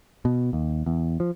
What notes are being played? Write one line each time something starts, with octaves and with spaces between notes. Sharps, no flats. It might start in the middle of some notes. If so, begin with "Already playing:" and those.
B2
D#2
E2
F3